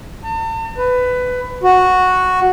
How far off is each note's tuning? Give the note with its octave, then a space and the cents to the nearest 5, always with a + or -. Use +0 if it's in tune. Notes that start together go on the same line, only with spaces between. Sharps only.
A5 +45
B4 +15
F#4 -5